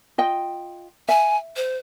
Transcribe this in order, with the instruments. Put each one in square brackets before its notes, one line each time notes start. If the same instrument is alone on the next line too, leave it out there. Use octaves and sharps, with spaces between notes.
[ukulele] F4 D#5 G5
[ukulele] E5 [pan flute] G#5
[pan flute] C5